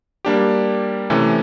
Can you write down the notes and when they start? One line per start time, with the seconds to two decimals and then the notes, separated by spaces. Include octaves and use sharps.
0.25 G3 A#3 D4 G4
1.10 C3 E3 A3 C#4